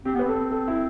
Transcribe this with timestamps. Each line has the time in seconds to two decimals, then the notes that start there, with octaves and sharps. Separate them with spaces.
0.05 C4 G4
0.15 B3
0.19 B4
0.24 C4 A4
0.52 A4
0.68 E4